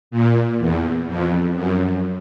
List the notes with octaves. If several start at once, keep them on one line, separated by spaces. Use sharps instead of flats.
A#2
E2
F2
F#2